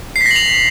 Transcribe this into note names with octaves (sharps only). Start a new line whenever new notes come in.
C7
B6
A#6
F#7
F7